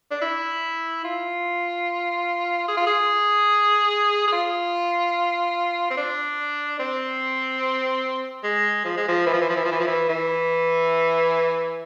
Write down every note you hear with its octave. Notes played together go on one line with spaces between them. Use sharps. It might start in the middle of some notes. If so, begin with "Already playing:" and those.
D4
E4
F4
G#4
F4
G#4
G#4
F4
C4
D4
C4
G#3
F3
G#3
F3
E3
F3
E3
F3
E3
F3
E3
F3
E3
E3